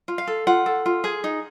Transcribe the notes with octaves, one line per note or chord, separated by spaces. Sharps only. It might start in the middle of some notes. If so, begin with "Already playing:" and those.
F4
F5
A4
F4 F#5
A4
F4
G#4
D#4